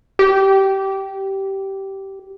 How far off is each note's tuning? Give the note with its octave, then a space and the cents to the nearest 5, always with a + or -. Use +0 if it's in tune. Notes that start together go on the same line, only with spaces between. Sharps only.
G4 -15